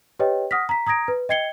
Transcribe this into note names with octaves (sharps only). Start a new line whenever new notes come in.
G4 B4 C#5 D#5 G5
F#5 D#6 F6 A#6 B6
A#5 B6
A#5 D#6 G#6 A#6 D7
B4
D#5 G5 G#6 C7 C#7 G7